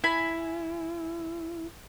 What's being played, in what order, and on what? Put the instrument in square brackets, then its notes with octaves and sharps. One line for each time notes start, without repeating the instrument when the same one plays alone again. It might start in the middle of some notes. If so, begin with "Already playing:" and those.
[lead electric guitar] E4 [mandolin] G#5 B5